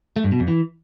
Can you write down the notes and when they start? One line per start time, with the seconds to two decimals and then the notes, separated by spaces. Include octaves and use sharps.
0.16 A3
0.24 G2
0.32 B2
0.40 F2
0.48 E3